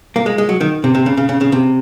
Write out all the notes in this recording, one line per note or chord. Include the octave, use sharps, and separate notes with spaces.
A#3
G#3
G#3
F#3
D#3
C3
C3
C#3
C#3
C#3
C#3
C3